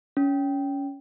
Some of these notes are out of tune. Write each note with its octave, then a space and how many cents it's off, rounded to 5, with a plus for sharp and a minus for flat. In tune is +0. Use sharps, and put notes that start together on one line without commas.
C#4 +20